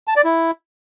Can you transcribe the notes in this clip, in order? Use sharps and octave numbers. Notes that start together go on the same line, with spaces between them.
A5
D5
E4